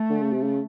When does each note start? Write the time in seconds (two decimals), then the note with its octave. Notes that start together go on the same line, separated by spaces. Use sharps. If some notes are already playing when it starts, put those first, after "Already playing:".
Already playing: A3
0.10 D3
0.21 C#3
0.32 C3
0.43 C#3